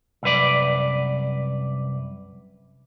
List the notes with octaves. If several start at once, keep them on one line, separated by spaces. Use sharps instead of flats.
C2 F#2 B4 D5